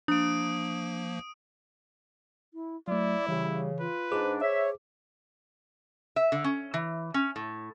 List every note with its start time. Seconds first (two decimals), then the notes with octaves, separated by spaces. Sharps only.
0.08 F3 A#3 D4 D#6 D7
2.54 E4
2.88 F#3 A3 E4 D5
3.28 C#3 E3 G3
3.80 F4 B4
4.12 G#2 D4 G#4 C5 D6
4.41 C#5 E5
6.16 E5
6.32 D3
6.44 C#4
6.74 E3
7.14 C#4
7.36 A2